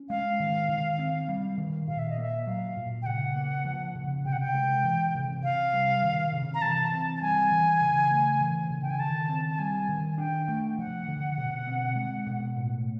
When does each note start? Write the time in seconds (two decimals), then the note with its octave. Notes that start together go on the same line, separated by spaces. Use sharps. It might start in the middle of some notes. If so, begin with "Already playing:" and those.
Already playing: C#4
0.10 G#3 F5
0.40 D#3
0.69 D#3
0.99 C4
1.29 G3
1.57 D#3
1.87 A#2 F5
1.99 E5
2.10 D#5
2.18 A#3 E5
2.47 F#3 F5
2.76 A#2
3.02 G5
3.06 C#3 F#5
3.36 A#3
3.65 F3
3.95 C#3
4.25 C3 G5
4.32 F#5
4.41 G5
4.54 G#3
4.84 E3
5.14 C3
5.44 C3 F5
5.73 G3
6.03 D#3
6.33 C3
6.54 A#5
6.62 E3 A5
6.92 C4
7.17 A5
7.21 G3 G#5
7.51 E3
7.81 C#3
8.10 A3
8.41 E3
8.70 C#3
8.82 G5
8.90 G#5
9.00 D#3 A5
9.29 C4
9.50 A5
9.59 G3 G#5
9.89 D#3
10.11 G#5
10.18 D4 G5
10.48 A3
10.78 F3 F#5
11.08 D3
11.37 B2
11.67 C4
11.96 G#3
12.26 B2
12.56 A2